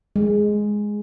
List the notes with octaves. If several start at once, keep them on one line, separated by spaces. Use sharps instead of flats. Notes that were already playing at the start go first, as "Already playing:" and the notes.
G#3